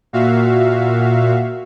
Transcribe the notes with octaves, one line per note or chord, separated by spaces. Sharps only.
A#2 F#4 E5 F5